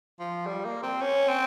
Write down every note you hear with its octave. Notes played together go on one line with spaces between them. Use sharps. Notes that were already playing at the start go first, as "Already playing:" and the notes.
F3
G3
A#3
C4
C#4
C4